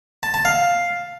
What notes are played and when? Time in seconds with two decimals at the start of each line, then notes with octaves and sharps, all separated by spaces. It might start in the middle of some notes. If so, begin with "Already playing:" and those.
0.23 A5
0.34 A5
0.45 F5